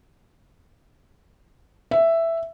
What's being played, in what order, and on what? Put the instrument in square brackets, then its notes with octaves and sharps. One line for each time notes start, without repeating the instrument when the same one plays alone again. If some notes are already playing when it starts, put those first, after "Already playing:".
[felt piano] E5